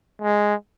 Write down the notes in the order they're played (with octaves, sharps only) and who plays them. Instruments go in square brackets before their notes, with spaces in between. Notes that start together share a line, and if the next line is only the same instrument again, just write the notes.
[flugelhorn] G#3